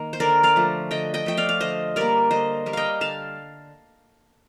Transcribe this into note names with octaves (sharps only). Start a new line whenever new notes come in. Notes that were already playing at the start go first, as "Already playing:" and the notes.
Already playing: D#3 A#3
C5
D3 A#4 D5
D5 F5
F3 A3
D3 D#5 G5
D#5 G5
F3 A3 G5
D5 F5
F5
D3 C5 D#5
G3 A#3 A#4 D5
D3 C5 D#5
G3 A#3
D#5 F5 G5
D3 F5 A5